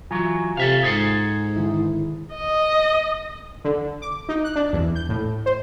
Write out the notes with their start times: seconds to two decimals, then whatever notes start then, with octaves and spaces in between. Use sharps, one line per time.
0.11 E3 F#3 F4 G#5 A#5
0.57 C3 A4 E5 F5
0.83 G#2 G#4 A4 C5
1.56 D3 D#3 E4
2.34 D#5
3.64 D3
4.02 D6
4.29 D#4
4.44 F#6
4.55 D4
4.73 E2
4.95 G6
5.09 A2
5.46 C5